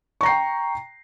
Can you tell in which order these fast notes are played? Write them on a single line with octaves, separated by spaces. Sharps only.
C#6 A#5 C7 G5